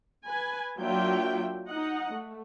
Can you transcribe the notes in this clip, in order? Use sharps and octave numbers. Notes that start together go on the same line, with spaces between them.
B4 G#5
F#3 A#3 D4 F4 E5 G5
D#4 D#5 F#5
A3